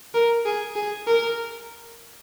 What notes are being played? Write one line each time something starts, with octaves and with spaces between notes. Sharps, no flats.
A#4
G#4
G#4
A#4